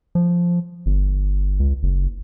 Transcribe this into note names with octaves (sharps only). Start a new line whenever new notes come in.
F3
G1
C#2
F#1